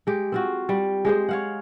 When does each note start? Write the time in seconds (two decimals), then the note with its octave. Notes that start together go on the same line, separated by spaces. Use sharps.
0.07 G#3 G4
0.32 C4 F4 F#4
0.69 G3
1.05 G#3 G4 G#4 C5
1.29 C#5 F5 F#5